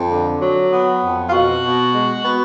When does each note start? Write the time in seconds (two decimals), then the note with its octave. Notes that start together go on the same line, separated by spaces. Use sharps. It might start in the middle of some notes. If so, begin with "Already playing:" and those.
Already playing: F2
0.10 D3
0.41 F#3
0.71 B3
1.02 F2
1.27 F4
1.33 B2 F#4
1.64 B2
1.94 G#3
2.24 B3